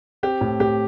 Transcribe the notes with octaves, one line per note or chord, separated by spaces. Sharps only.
C4 G4
A2
A2 G4